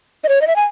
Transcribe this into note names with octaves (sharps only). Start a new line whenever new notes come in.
D#5
C#5
D#5
E5
G#5